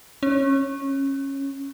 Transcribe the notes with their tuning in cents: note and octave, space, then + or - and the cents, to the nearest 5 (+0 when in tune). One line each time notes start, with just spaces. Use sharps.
C#4 -15